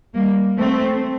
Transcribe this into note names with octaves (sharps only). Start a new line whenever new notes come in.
G3 A#3
A3 C4